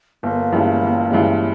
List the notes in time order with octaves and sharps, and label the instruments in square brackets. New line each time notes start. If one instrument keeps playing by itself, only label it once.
[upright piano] G1 [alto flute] A#3
[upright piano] G2 E3 G#3 C#4
G1
G2 E3 G#3 C#4